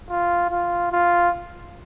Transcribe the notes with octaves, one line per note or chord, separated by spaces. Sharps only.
F4
F4
F4